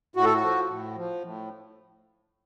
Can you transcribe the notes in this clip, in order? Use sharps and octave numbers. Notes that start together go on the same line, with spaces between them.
A2 F#4
A4
F#4
F3
A2
F3
A2